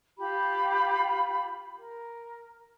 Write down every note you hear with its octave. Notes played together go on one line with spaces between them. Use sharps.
F4 G4 B5
A#4